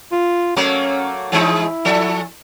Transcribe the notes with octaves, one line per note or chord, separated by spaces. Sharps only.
F4
F#3 A3 A#3 C#4
E3 G#3 D#4 E4
F3 A4 E5